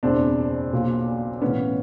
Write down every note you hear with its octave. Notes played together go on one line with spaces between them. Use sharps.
F#1 E2 B2 C4 D4
B1 A#2
B1 A2 E3 B3 C#4